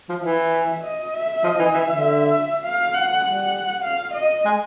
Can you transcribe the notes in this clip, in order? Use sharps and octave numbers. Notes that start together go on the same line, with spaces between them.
F3
E3 E5
D#5
E5
F3 D#5
E3
E3 E5
D3
F5
F#5
G3 F#5
F5
D#5
G#3